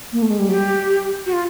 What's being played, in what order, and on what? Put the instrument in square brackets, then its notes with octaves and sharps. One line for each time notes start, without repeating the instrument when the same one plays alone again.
[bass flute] A#3
A3
G#3
G3
[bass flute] F#3 [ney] G4
[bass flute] G3
[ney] F#4
F4